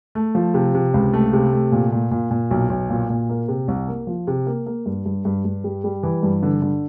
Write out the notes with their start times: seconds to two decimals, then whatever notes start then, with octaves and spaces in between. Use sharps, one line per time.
0.15 A3
0.35 F3
0.54 C3
0.74 C3
0.94 C#2
1.13 A3
1.33 C3
1.52 A3
1.72 A#2
1.92 A#2
2.11 A#2
2.31 A#2
2.51 B1
2.70 B1
2.90 A#2
3.09 A#2
3.29 A#3
3.48 C3
3.68 C2
3.88 A#3
4.07 F3
4.27 C3
4.46 A#3
4.67 A#3
4.86 G2
5.06 G2
5.25 G2
5.45 G2
5.64 G3
5.84 G3
6.03 E3
6.23 G2
6.43 D3
6.62 D3